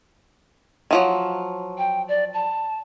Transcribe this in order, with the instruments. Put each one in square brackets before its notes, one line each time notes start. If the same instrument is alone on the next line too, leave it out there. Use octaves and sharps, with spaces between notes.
[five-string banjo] D#3 F3 F#3
[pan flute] G5
D5
A5